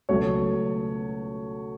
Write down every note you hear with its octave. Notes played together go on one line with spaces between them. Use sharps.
C#2 B2 F#3 A3 C#4 C#5